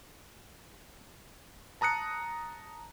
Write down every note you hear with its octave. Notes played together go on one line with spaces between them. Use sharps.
A5 A#5 D#6 F#6 C#7